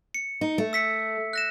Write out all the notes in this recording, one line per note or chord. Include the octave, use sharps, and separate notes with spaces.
C#7
D#4
A3
E6 B6 C#7
F#6 A#6 E7